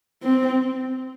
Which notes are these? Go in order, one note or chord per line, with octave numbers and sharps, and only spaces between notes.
C4